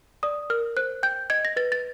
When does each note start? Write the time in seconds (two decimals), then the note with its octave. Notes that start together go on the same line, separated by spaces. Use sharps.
0.23 D5 D#6
0.50 A#4 F6
0.77 C5 F#6
1.03 G5 G6
1.30 D#5 G#6
1.45 A#6
1.56 B4 A6
1.72 A6